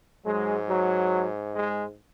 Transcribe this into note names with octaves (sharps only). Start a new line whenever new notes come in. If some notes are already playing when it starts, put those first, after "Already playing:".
G#2 F#3 G#3
F#3
G#3